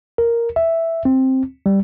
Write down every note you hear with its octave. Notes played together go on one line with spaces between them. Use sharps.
A#4
E5
C4
G3